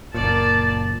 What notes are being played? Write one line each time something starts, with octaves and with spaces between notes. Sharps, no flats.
F#1 A#2 A#3 D5 A5